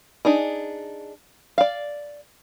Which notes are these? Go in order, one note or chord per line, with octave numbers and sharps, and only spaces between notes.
D4 D#4 G#4
D5 F5